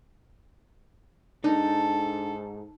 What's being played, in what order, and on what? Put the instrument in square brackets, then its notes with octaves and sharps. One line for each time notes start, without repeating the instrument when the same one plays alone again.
[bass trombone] G#2 [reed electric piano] D4 [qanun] D#4 [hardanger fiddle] A4